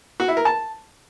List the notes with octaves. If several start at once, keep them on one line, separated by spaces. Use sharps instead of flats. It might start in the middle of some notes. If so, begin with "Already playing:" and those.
F#4
E4
A#4
A5